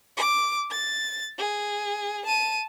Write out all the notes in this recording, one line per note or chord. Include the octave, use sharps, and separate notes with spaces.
D6
A6
G#4
A5 D#7